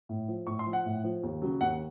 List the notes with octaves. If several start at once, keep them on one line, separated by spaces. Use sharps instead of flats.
A2
F3
A2 C#6
C6
F3
F#5
A2
F3
D#2
C#3 F#3
D#2 F#5